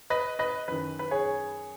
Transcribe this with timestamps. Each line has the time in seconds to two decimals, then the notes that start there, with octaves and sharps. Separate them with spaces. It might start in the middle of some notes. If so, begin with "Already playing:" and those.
0.10 B4 D#5
0.39 B4 D#5
0.68 F#2 D#3 B4
0.99 B4
1.11 G#4 C#5